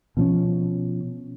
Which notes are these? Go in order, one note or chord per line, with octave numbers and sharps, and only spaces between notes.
B2 F3 C4 C#4